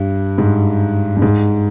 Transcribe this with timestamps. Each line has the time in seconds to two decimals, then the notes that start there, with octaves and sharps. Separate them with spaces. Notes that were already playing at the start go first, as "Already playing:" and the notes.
Already playing: G2
0.38 G#2
1.17 G2
1.22 G#2